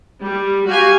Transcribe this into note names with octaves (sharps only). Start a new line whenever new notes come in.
G3
F#4 G4 F5 G#5